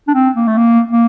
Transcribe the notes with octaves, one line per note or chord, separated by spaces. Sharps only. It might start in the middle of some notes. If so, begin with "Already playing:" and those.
D4
C4
A#3
A3
A#3
A#3